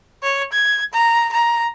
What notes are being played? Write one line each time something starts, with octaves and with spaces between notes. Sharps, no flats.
C#5
G#6
A#5
A#5